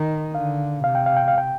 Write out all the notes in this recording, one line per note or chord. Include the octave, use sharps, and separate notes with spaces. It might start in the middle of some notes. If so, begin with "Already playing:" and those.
Already playing: D#3 D#5
D3 F5
C3 F5
G5
F5
G5
F5
G5